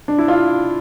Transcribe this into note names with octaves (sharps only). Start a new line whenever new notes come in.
D4
E4
F4